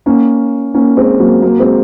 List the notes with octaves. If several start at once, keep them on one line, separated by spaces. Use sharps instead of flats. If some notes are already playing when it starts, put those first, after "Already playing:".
A#3 C#4
A#3 C#4
G#3 C4
F#3 A#3
F#3 A#3
G#3 C4